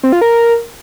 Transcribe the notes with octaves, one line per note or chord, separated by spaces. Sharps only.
C4
F4
A#4